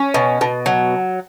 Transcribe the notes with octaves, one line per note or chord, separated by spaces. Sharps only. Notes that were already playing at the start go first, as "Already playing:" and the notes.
Already playing: C#4
B2
B2
F#3